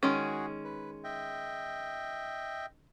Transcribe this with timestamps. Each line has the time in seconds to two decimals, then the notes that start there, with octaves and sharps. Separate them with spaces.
0.03 D#3 G#3 C#4 F#4 G#4
0.65 B4
1.04 D#5 E5 G5